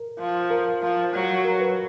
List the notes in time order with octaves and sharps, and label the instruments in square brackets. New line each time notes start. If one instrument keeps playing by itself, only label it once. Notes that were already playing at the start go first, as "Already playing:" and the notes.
Already playing: [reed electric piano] A#4
[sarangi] F3
[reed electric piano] A#4
[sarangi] F3
F#3
[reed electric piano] A#4
B4